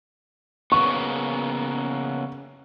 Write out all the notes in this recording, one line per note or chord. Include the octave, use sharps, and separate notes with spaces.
C#3 A#3 B3 C#6